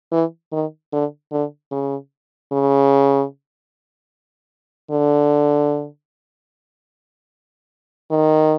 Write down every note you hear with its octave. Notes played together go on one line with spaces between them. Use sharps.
E3
D#3
D3
D3
C#3
C#3
D3
D#3